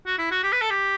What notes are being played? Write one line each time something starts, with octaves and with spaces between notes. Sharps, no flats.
F#4
E4
F#4
G4
B4
A4
G4